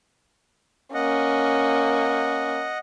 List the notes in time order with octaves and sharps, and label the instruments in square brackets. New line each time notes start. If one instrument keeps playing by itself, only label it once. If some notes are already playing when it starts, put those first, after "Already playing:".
[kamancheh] A#3 C#4 [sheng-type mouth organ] D#5 F#5